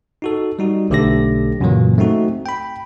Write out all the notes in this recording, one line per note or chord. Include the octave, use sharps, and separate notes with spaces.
D#4 F#4 A4
G3 D#4 F#4
B1 D3 A3 G4 A4 A#6
F#2 A#2 C#3 E3 F#3 A#3
A3 C4 D#4 F#4
G5 B5